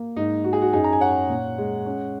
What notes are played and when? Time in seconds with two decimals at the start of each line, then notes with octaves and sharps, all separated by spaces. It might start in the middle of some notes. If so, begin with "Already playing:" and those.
Already playing: A#3
0.16 G#2 D#4
0.44 D#4 F#4
0.53 G#4
0.62 F#4
0.73 F#2 D#4 G#4
0.84 A#5
0.93 G#5
1.00 D#4 C#5 F#5
1.29 A#2
1.58 G#3
1.86 C#4